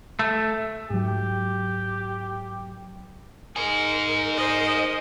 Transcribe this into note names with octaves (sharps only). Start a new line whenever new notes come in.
A3
G#2 F#3 G4
D#4 G#4 A#4
A#4 C5 D#5